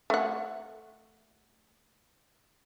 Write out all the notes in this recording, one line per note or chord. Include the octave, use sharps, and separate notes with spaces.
A3 F#5